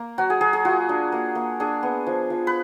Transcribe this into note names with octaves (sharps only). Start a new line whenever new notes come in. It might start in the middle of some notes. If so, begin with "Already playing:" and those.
Already playing: A#3
F#3 F#4
G#4
F#3 G#4
G#4
F4 F#4
D4
A#3
A#3
D4 G#4
B3
F3
F3
B4